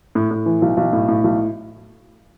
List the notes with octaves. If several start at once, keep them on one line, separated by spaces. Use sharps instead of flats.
A2
A2
E3
B1
B1
A2
A2
B1